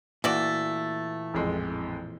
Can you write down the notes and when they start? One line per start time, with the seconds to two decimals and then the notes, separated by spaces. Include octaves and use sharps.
0.24 A#2 E3 A3 F#4 D5
1.34 A1 F2 G#3